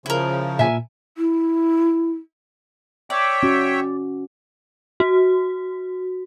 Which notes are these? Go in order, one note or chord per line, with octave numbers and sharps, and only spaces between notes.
C#3 F3 E4 A#4
A#2 E5 G#5
E4
C#5 D5 E5 G5
C#4 F#4
F#4